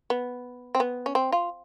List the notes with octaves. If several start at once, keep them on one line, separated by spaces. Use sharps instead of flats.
B3
C4
B3
C#4
C4
F4